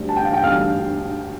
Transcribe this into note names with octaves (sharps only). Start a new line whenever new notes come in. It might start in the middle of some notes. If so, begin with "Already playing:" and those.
Already playing: D2 D3 G3
A5
G5
F5
G5
D2 D3 G3 F5 F6